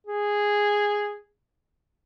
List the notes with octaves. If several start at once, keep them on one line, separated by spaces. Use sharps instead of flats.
G#4